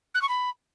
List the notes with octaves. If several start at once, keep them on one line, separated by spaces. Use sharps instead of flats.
F#6
C#6
B5